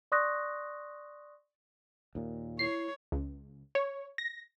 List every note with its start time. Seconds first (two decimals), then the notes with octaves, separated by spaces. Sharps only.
0.12 D5 C6 C#6 D#6 F#6 A#6
2.15 D#2 A#2
2.59 E4 C#5 C7
3.12 C#2
3.75 C#5
4.18 A#6